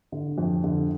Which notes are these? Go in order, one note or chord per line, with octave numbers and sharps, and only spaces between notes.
D3
F2
D3